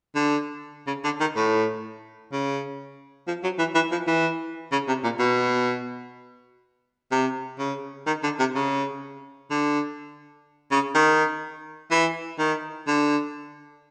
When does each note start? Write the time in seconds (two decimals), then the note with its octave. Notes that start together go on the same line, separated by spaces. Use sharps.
0.15 D3
0.87 C#3
1.04 D3
1.20 D#3
1.36 A2
2.32 C#3
3.28 F3
3.44 F#3
3.59 E3
3.75 E3
3.92 F3
4.07 E3
4.72 C#3
4.88 C3
5.04 A#2
5.19 B2
7.12 C3
7.59 C#3
8.07 D#3
8.24 D3
8.39 C3
8.55 C#3
9.50 D3
10.71 C#3
10.95 D#3
11.91 E3
12.39 D#3
12.87 D3